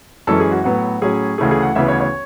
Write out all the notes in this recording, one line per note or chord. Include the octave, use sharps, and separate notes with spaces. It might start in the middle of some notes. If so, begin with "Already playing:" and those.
F#2 E3 G#3 C#4 A4
G#4
F#4
A2 F#3 B3 F#4
A2 F#3 C#4 G#4
D2 C#3 E3 A3 G#4
G#4
F#5
D2 C#3 E3 B3 E5
C#5
C#5